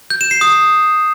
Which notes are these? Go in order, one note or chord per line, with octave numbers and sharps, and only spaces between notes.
G6
E7
C7
D#6